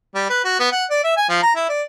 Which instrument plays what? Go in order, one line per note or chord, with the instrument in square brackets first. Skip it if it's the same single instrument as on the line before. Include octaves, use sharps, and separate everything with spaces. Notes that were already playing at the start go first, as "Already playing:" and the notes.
[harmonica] G3
B4
F#4
B3
F#5
D5
E5
G#5
F3
A#5
E4
D5